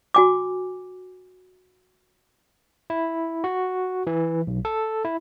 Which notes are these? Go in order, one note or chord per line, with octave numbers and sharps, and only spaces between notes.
F#4 G#5 D6
E4
F#4
E3
B1
A4
E4